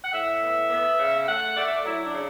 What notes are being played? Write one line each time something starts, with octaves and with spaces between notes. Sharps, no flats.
F#5
A2 E5
B3
B3
C#3
A3 F#5
A3 D5
E5
D5
F#3 E4
D4
C#3